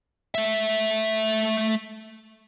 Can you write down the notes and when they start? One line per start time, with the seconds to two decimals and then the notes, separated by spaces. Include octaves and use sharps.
0.35 A3 E5